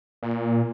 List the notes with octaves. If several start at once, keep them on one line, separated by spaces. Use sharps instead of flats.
A#2